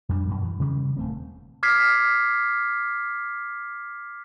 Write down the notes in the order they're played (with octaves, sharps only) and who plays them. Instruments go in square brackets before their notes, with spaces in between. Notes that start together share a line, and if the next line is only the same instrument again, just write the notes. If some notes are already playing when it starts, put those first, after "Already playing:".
[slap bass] F2 G3 D4
F#2 B2 D#3 F#3
E3
C3 D#3 G3 C#4
D#1 A3 C4
[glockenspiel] D6 F6 G#6 B6 C7